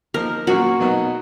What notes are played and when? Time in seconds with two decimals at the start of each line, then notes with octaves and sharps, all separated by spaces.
0.14 F3 A#3 D#4 A#4
0.47 A#2 F#3 A#3 C#4 F#4
0.79 B2 F#3 B3 D#4